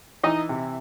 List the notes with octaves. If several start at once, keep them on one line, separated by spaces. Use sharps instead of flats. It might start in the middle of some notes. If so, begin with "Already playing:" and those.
E3 D#4 D#5
C3